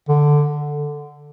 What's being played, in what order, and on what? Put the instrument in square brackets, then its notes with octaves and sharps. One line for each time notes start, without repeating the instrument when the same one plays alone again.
[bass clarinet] D3